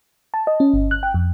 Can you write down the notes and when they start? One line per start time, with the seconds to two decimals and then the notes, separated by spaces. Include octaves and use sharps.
0.34 A5
0.47 D#5
0.60 C#4
0.74 G1
0.91 F#6
1.03 G5
1.14 F2